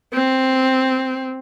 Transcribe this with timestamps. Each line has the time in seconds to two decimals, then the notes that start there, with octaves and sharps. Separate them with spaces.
0.14 C4